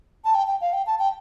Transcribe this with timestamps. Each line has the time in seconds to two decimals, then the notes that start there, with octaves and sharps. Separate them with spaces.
0.25 A5
0.35 G5
0.47 G5
0.61 F5
0.73 G5
0.86 A5
0.99 G5